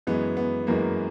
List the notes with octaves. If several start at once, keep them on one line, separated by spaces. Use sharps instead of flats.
F#2 E3 G#3 B3
B3
F#2 E3 G#3 A#3